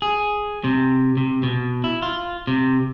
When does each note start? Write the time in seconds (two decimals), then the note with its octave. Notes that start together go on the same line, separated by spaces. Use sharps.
0.02 G#4
0.64 C3
1.17 C3
1.43 B2
1.84 E4
2.02 F4
2.47 C3